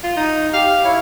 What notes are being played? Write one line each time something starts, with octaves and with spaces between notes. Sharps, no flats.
F4
D#4
G4 F5
E4 C#5 F5